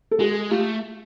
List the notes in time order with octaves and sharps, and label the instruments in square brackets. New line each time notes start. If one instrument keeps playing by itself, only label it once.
[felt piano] A4
[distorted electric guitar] G#3 [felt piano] F#4 G#4
[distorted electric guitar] A3 [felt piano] F4 G4